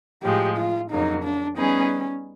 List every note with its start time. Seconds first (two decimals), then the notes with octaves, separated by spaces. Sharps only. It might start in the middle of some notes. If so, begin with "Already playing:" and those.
0.23 A2 F3 G#3 G4
0.57 F4
0.91 F2 C#3 F#3 A#3 D#4
1.24 D4
1.57 G3 B3 C#4 D#4 G#4 B4